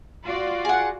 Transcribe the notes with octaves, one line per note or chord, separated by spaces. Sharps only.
F4 F#4 D5
G#4 F#5